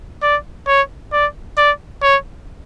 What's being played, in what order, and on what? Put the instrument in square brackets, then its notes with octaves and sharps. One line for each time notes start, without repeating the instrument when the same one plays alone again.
[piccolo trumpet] D5
C#5
D5
D5
C#5